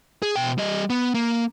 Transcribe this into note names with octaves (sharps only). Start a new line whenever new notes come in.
G#4
B2 G5
G3 D#5
B3
A#3